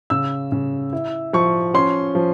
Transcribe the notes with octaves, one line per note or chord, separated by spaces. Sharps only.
C#3 E6
C#3
E4
F3 C#6
C#4 C6
F3